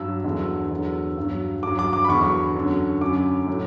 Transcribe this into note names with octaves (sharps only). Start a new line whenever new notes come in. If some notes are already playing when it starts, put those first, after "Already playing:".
Already playing: G2 F#3 E6
E2 D3 F#3
E2 D3 F#3
G2 F#3
G2 F#3 D6
D6
D6
B5
E2 D3 F#3 C#6
F#2 D3 F#3
F#2 D3 F#3 D6
A2 F#3